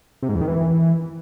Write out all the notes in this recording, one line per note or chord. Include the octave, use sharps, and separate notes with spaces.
C3
G#2
E2
D#3
E3